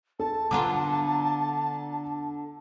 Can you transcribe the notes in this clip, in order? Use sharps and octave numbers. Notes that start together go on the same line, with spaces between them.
A4 A5
D3 B3 F4 F#5 A#5 D6